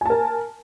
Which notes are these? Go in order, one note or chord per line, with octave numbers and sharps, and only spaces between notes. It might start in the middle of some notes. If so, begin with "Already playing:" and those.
A#4 G#5 A5